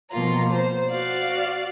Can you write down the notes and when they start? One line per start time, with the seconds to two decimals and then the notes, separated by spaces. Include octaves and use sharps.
0.11 B2 F3 A#3 F4 A#5
0.53 C5
0.91 F#4 D5 F5